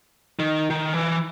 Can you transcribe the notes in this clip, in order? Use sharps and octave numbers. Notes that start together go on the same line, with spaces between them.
D#3
D#3
E3